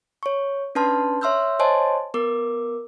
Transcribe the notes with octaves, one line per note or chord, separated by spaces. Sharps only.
C#5 C#6
C#4 D4 B4 A5 C6 F6
C#5 E5 C6 E6 F6 G6
C5 C#5 D#5 G#5 A5 C6
B3 A#4 D6